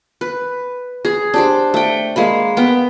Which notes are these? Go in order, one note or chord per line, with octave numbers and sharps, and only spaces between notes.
B4
G#4
D4 G4 C5
A3 G5
G#3 A#3 B5
B3 G5